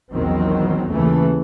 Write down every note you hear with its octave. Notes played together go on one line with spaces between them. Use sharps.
A#1 E2 D#3 F#3 C4
D#2 C#3 E3 A3